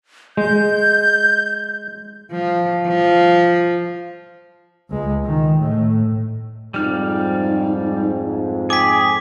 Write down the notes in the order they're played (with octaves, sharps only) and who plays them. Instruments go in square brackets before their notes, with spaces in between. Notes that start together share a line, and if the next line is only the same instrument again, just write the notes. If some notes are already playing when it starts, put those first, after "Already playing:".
[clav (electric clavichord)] G#3 [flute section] G6
[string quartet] F3
F3
[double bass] C#2 G#3
D#3
A2
[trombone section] F2 G#2 [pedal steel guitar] G3 F6 [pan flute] D#4
[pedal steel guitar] G#4 [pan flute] G5 [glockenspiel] D6 B6